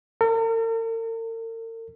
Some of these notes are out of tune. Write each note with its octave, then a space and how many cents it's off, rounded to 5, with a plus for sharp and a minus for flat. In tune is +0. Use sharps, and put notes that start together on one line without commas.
A#4 -45